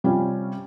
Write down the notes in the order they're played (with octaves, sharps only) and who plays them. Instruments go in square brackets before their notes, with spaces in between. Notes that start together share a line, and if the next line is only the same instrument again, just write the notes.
[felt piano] C3 G3 C#4 F4